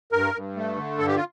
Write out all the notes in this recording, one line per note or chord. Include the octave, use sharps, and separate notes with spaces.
G2 A#4
G2
A3
D3
G2 A4
G4
F4